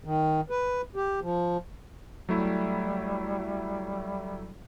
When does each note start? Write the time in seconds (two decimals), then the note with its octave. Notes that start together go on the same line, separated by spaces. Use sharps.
0.04 D#3
0.50 B4
0.96 G4
1.22 F3
2.29 F#3 G3 A3 E4